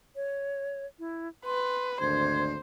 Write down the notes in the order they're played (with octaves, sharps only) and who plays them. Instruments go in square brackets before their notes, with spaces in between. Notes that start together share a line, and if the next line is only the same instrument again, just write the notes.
[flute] C#5
E4
[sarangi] B4 [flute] C6
[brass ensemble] G#1 D2 D4 [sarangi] C5 [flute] G#6